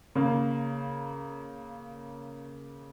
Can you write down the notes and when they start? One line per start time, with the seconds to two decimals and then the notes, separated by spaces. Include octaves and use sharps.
0.15 C#3 A#3